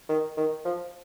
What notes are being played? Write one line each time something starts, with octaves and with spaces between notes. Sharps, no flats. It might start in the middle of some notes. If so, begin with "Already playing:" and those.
D#3
D#3
F3